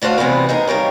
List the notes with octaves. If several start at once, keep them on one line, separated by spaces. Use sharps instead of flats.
D3 A3 F#4 C5 F5
C3 E3 G3 B3 C4
D#4 G#4 A#4
G3 F4 A#4 C#5